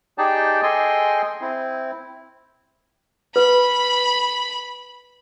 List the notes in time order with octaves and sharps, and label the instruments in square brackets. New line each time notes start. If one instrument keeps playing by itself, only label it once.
[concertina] D#4 G4 G#4 D5 G5 A5
G#4 A4 D#5 G5 G#5 C6
C4 E4
[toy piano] B4 [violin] B5